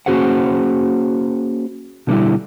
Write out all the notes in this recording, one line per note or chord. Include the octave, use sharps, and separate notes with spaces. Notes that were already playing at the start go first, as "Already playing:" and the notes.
A#3 C#4 F#4 G#4 C5 F#5
B2 D3 G3 E4